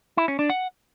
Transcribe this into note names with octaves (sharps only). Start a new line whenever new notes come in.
E4
C#4
D4
F#5